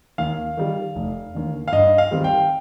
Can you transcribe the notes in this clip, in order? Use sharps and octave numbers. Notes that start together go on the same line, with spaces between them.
D#2 F5
D#3 G3
F1
D#2 D3
F5
G2 D#5
F5
D#3 G3 C4
G5